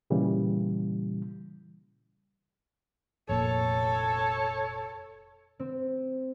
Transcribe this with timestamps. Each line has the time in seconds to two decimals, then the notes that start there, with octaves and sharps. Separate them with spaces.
0.10 A#2 C#3 E3 G3
3.29 F1 A#2 A4 C#5
5.59 C4